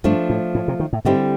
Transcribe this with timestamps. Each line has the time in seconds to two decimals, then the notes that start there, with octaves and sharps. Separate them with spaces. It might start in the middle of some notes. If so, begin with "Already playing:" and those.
0.04 G2 F3 A3 D4
0.30 A2
0.55 A2
0.68 C3
0.80 D#3
0.93 A2
1.05 G#2 D3 G3 C4 E4 G4